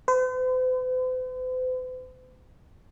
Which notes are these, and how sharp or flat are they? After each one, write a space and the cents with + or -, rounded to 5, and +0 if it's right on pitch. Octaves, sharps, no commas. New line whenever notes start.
C5 -45